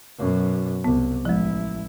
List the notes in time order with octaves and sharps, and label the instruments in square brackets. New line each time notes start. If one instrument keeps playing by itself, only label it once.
[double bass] F#2 B2
[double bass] C2 [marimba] B3
[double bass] A1 E4 [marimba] F3 G#3